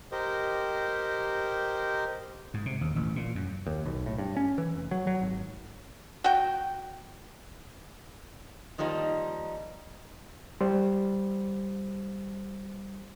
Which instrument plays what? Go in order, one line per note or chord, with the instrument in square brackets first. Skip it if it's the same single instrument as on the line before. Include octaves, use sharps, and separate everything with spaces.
[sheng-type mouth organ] G4 A#4 C5 D#5
[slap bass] G#2
C3
D#2
A1
A#2
F#2
[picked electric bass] D#2
B1
A2
G2
C#4
E3
F1
F#3
F#3
G#1
[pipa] F#4 G5
[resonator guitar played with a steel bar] D#3 F3 G3 A#3 D#4
[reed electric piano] G3 C5